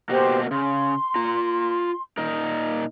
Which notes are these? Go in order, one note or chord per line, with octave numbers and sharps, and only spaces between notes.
B2 A#3 F#4 G4 C5
C#3 C6
F4 A#5
A#2 D#4 A#4